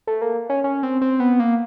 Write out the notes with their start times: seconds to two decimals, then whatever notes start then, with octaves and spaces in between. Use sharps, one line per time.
0.07 A3
0.22 A#3
0.50 C#4
0.64 C#4
0.83 C4
1.01 C4
1.20 B3
1.40 A#3